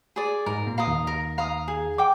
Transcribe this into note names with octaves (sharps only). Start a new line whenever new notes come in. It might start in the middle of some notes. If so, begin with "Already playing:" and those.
G#4 D5
G#2 G#3 A#4
A#2 A#3
F5 A#5 D#6
D#2 D#3
A#4
F5 A#5 D#6
G#4
G5 D6